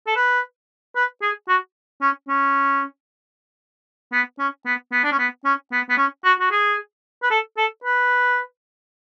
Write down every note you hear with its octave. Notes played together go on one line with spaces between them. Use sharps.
A4
B4
B4
G#4
F#4
C#4
C#4
B3
C#4
B3
B3
D4
C#4
B3
C#4
B3
B3
C#4
F#4
F#4
G#4
B4
A4
A4
B4